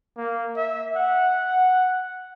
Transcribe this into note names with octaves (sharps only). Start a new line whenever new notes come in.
A#3
E5
F#5